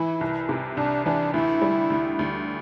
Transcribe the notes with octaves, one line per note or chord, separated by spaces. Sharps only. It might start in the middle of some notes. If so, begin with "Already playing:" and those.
Already playing: E3 E4
C2
C3
C2 D4
E3 D4
D2 E4
G3
D2
D2